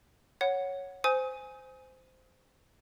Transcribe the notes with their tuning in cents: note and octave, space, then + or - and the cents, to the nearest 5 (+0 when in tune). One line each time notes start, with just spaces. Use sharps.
C#5 +0 F#5 +0
C5 -15 G#5 +0 D#6 +35